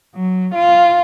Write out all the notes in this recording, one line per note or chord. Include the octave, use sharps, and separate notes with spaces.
F#3
F4